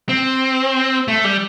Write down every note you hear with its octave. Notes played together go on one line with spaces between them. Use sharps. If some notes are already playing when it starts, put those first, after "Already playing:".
C4
A3
G3